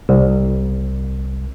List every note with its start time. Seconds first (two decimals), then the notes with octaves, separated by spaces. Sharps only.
0.09 C2